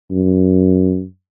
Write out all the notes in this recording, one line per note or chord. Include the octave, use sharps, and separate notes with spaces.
F#2